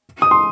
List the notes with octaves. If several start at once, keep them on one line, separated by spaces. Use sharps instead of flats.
D#6
C6